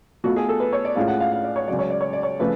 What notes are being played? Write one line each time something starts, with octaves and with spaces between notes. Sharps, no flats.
B2 A3 F4 F#4
G#4
A4
B4
C#5
D5
A2 G#3 C#4 F4 F5
F#5
F5
F5
D5
C#5
C#2 C#3 F#3 D5
C#5
D5
C#5
D5
C#5
C#3 F3 A3 B4